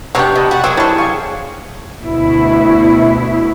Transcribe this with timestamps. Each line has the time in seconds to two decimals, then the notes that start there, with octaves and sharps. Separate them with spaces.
0.15 C3 F#3 B3 D4 C#5 F#5 G5
0.35 C3 D#5 A5 B5
0.51 F#4 D5 F#5
0.64 F#3 A#3 C4 D4 G#4 E6
0.77 G3 E4 A4 C#5 A5
0.98 F5 G5 G#5 C#6
2.02 D2 B2 E4